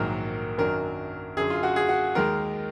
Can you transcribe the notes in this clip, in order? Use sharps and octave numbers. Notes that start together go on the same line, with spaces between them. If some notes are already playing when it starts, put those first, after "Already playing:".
Already playing: A#1 G#2 D#3 F#3 A#3 A#4
F#2 D#3 F#3 D4 A#4
F#2 D3 F#3 G#4
F4
F#4
G#4
F#4
D#2 D#3 G#3 A#4